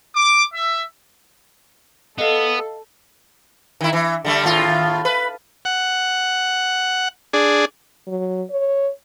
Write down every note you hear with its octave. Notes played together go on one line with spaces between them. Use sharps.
D6
E5
B3 A4 D#5 F5
D#3 E4
E3
D3 G3 A3
D#2 A2 F4
B4
F#5
D4 G#4
F#3
C#5